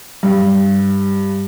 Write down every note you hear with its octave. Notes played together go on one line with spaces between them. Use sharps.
G2